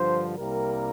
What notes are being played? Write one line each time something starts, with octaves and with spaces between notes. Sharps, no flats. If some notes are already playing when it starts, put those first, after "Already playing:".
Already playing: G2 D3 F3 C5
C2 C3 G3 A#3 A#4